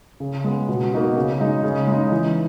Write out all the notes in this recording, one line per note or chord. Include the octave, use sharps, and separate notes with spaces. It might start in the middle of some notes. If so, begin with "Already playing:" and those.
C#3
G#3 B3
B2
A#3 D#4 F#4
C#3
G#3 D#4
C#3
G#3 D#4
E3